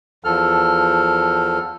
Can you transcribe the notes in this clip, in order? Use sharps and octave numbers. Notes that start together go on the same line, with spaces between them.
E2 F3 A4 F6